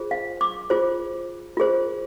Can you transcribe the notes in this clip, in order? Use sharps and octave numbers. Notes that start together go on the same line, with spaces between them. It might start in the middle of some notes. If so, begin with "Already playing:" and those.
Already playing: F4 G#4 C5
F5
D6
F4 G#4 C5
F4 G#4 C5